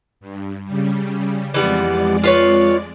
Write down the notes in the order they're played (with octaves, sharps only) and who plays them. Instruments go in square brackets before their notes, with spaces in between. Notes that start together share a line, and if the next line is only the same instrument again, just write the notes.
[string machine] G2
C#3 G3
[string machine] F2 G#3 D5 [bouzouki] E3 G3 B3
[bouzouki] F4 B4 C#5